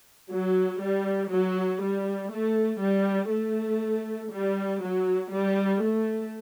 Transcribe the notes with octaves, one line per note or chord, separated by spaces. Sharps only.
F#3
G3
F#3
G3
A3
G3
A3
G3
F#3
G3
A3